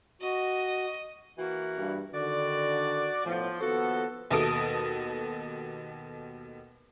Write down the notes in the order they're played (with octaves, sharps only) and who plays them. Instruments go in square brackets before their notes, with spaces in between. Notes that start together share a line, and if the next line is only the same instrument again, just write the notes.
[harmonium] F#4 [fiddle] D#5
[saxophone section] E3 A#3 F#4
[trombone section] G2
[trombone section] D3 D#3 [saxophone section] F#4 D5
[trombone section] B1 A2 B3 [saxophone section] F3
[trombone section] D#2 F3 B3 [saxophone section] F#4 A4
[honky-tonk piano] D#2 B2 A4 D#6 D7